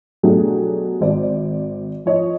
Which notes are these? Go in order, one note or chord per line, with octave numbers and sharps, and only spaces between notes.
B2 F#3 A3 D4 G4 G#4
G#1 C5 D5
F3 C#5 D#5